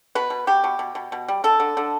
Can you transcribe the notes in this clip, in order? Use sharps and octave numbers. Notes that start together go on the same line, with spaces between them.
B2 B4
B2
B2 G4
B2
B2
B2
B2
G3
D3 A4
D3
D3